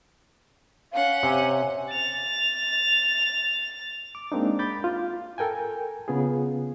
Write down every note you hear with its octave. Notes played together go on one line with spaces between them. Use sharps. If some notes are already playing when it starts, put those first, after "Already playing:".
C#4 F5 F#5
C3 G#5
A6 F7
D6
G#3 A#3 C4 D4 D#4
B5 D6 G6 A6
F4
A4 A#4 G5 G#5
C#3 B3 F4 G#4